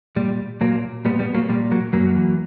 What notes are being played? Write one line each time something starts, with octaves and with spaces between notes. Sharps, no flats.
A#2 G3
A#2 F#3 A#3
A#2 G3 B3
G3 B3
F#3 A#3
A#2 G3
F#3 A#3
F#2 F#3 A#3
E3